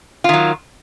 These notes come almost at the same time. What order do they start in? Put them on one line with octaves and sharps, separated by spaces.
F4 D#3 F#3